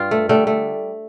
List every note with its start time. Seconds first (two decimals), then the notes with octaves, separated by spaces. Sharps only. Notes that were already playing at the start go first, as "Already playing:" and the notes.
Already playing: G2 F4 G4
0.11 A3
0.29 D3 G3 A3
0.47 A3